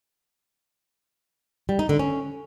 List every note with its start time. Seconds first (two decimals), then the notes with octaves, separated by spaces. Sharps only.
1.69 G3
1.79 D#4
1.89 D3
1.99 C#4